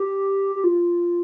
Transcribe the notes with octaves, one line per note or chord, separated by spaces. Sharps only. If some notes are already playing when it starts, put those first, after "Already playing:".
Already playing: G4
G4
F4